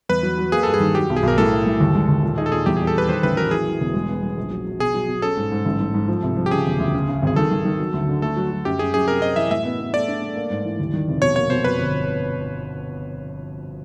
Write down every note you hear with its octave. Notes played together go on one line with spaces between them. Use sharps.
E2 B4
F#3
F#3
A#3 G#4
G2 A4
G#4
D#3
F#3 G4
B1
G#4
B1 A#4
A2 A4
A2
A2
D#2
G#3
D#2
A#2
D#4 G#4
A4
A#2 G#4
E2 G4
G3 G#4
A4
G3 B4
D#3 C5
A1 B4
F#3 A#4
E3 G#4
E3
E1
G#3
B3
G#3
A#1
F#3
F#3
B2 G#4
F#3
B2
C#4 A4
G#2
G#2
A1
G#2
G#2
F3
C2
F3
G4
C#3 G#4
E1
D2
C#3
C#3
G#1 G#4
D#3 A4
D#3
D#3
F#3
D2
D3
A3 A4
F#3
F#3
F#2 G4
F#2 G#4
F#2 G#4
C3 A#4
C4 D#5
E3 E5
A2 E5
B3
B3
A3 D5
D4
A3
A#3
G#2
E3
D#2
D#3
F1
B2 C#5
A#3 C#5
B2 C5
F2 B4
G1